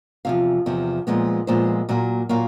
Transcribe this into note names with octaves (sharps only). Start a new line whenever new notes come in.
E2 C3 F3 F5
E2 C3 F3
A#2 F3 G#3 B3
A#2 F3 G#3 B3 C5
A#2 F#3 A#3
A#2 F#3 A#3 F5